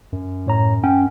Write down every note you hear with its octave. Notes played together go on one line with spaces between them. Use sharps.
F#2
A2 C#5 A#5
C#4 F#5 G5